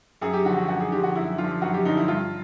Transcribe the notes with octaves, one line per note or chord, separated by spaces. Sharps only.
F#2 G#4
G4
D3 F3 F#4
F#4
F#2 F#4
G#4
D3 F3 G4
F#4
F#2 E4
D3 F3 F4
F#2 F#4
G4
D3 F3 D#4
E4
G2 F4